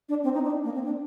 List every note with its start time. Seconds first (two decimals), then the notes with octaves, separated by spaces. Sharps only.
0.09 D4
0.24 C4
0.34 D#4
0.44 D4
0.64 A#3
0.74 C4
0.84 D4